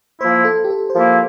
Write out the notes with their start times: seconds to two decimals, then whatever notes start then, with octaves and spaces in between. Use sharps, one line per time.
0.20 F3 A#3 E4 C5
0.45 A4
0.64 G4
0.70 A4
0.90 C5
0.94 F3 A#3 E4 A#4